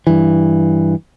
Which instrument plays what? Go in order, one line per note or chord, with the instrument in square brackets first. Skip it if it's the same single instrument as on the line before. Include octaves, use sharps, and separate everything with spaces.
[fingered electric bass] G2 E3